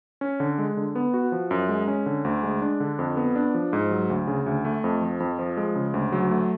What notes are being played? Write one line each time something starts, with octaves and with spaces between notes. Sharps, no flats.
C#4
D3
G#3
D3
B3
F#4
F3
F#2
G#3
C#4
D3
D2
G#3
D4
D3
F2
B3
D4
F3
G#2
F#3
D2
C#3
D2
A3
F2
F3
F2
F3
G#3
C#3
D2
F#3
A3